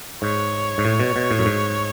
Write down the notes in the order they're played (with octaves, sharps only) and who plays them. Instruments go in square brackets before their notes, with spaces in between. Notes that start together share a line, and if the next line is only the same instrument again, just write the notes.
[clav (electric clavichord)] G#2 [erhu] C#5
[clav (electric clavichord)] G#2
A2
B2
B2
A2
F#2
G#2